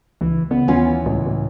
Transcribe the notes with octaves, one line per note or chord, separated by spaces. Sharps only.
C#2 E3
C#3 B3
D#2 E3 C#4 F4
C#2 A2
A2